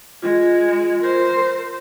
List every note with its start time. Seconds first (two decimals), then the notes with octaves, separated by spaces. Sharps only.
0.22 G#3 F4
1.03 A#4 C5